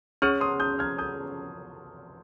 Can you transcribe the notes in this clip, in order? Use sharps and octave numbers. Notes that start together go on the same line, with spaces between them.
C#4 G#4 C#5 C#6 F6
C6 D#6
D#6 G6
F6 G#6
D#6 G6